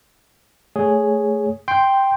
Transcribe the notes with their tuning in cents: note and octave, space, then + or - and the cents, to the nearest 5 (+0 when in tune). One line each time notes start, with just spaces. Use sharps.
A3 +0 G#4 +0 C#5 +5
G5 +0 C6 +0